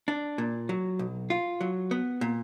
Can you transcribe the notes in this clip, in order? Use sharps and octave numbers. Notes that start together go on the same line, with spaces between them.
D4
A#2
F#3
B1
F4
F#3
B3
A#2